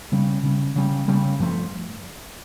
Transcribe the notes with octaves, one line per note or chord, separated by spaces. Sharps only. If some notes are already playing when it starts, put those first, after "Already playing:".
C#3 G3 C#4
C#3 G3 C#4
C#3 G3 C#4
C#3 G3 C#4
G2 F3 A3